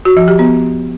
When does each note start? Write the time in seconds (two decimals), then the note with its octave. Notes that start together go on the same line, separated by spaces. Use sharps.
0.05 F#4
0.17 F3
0.28 G4
0.39 B3